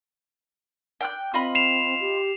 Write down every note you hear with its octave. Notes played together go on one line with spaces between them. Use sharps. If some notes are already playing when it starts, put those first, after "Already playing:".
G5 F6 F#6
C4 F4 D#5 B5
C7 E7 F7
G4